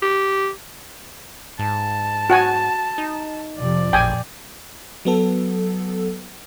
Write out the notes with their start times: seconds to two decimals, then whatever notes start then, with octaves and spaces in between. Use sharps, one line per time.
0.02 G4
1.59 G#2 A5
2.30 F#4 F#5 G#5
2.98 D#4
3.58 F2 C3 F3 D5
3.93 A1 A#2 G5 G#5
5.05 F#3 B3 A4